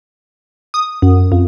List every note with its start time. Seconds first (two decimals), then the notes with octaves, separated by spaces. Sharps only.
0.74 D#6
1.02 F#2
1.32 F2